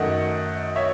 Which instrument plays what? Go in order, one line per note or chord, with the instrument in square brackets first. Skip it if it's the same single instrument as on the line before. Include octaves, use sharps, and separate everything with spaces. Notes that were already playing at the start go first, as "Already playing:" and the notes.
Already playing: [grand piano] F#2 D#3 A3 D#5 F#5
C#5 E5